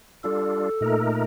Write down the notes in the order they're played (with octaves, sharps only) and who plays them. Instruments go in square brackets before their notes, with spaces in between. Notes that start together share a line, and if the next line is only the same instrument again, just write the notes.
[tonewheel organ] G3 D4 F4 [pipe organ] A4
[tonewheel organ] A#2 A3 D#4 A#4